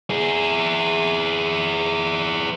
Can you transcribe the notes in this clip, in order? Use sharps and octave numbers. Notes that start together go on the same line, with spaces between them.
E4 G#4